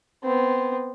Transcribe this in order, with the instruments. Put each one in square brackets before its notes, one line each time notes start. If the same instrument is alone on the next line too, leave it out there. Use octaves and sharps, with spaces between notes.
[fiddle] B3 C4